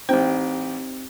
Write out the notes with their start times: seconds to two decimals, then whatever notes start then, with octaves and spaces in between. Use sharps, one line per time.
0.09 A1 C4 D#4 G4 C5 G5